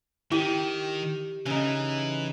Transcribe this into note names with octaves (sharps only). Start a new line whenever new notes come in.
D#3 E4 G4
C#3 E3 D#4